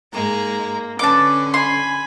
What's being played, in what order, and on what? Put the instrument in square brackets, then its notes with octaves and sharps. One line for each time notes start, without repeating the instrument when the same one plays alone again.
[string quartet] G#2 G#3 A#5 [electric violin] A#3
[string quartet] D3 C#4 [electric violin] B4 [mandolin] A5 D6
[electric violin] G#5 B5 [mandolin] C6